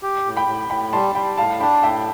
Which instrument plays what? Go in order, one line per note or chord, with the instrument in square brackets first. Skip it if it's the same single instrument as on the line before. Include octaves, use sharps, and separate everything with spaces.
[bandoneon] G4
A2
[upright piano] G5 B5
[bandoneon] A2
[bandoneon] A2 [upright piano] G5 B5
[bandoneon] G3 [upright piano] A5 C6
[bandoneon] G3 [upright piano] G5 B5
[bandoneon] A2 [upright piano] F5 A5
[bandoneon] D4 [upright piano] G5 B5
[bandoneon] A2 [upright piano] E5 G5